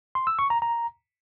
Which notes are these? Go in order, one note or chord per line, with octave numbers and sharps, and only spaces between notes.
C6
E6
C#6
A#5
A#5